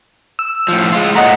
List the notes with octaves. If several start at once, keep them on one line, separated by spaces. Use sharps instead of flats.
E6
A2 F3
G#3 F4
A#2 A3 D#5 F#5 A#5